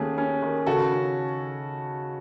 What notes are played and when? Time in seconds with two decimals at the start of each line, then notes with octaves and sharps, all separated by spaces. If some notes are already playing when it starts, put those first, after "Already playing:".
Already playing: D#2 A3 C#4 G#4
0.18 C#4
0.42 D#3
0.66 C#3 F#4 A4
0.92 C#4